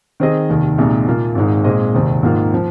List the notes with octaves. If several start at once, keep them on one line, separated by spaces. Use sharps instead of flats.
D#3 C4 G#4 D#5
F1 D#2 D#3
C2 A#2 G#3 D#4
A#2 A#3 F4
G#1 G#2 G#3 D#4
A#2 G#3 C4 G#4 D#5
F1 D#2 D#3 C4 D#4
G#2 D#3 A#3 F4
F3